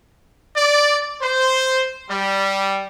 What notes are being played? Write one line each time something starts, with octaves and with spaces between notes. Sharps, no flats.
D5
C5
G3